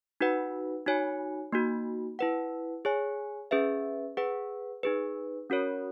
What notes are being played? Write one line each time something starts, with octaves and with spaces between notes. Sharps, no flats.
D#4 F#4 B4 F#5
D#4 F#4 C#5 G#5
A#3 D#4 F#4
E4 B4 F#5
G#4 C#5 G#5
C#4 G#4 B4 E5
G#4 B4 F#5
D#4 G#4 B4
C#4 F#4 A#4 C#5